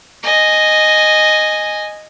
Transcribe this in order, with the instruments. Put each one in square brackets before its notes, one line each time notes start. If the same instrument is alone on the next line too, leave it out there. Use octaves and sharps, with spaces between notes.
[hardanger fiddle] D#5 G#5